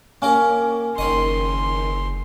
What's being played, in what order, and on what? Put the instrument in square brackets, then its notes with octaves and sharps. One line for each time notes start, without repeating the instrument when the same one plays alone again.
[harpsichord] A#3 G4 A#4 [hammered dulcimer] C#4
[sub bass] F#1 [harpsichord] D#3 C#5 D#5 [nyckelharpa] C6